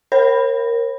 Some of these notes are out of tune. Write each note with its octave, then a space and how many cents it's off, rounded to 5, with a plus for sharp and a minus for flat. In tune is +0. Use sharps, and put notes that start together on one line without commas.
A#4 +0 C#5 -45 B5 +0